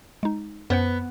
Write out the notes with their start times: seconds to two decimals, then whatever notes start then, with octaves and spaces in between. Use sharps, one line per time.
0.23 G#3 D#4
0.70 F#2 B3 C5 F#5